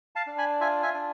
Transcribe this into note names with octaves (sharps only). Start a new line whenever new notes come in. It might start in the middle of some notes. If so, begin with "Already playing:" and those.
F5 A5
D4
G#5 B5
F4 E5 G#5
E5 G#5
D4